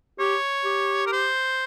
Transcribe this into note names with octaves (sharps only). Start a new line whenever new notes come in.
G4 C#5
G4
A#4
C5